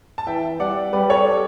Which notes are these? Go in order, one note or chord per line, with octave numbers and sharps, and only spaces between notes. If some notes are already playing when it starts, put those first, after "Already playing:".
A5
E3 E5 G5
G3 D5 F#5
G3 B4 D5
A4 C#5
A4